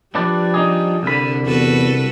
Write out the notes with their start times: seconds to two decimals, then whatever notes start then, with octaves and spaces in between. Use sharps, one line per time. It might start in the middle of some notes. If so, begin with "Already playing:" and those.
0.15 F3 G3 D4 B4 D5
0.54 D4 D#4 G#4
1.03 C2 D3 B5
1.46 E2 F#4 A4 B4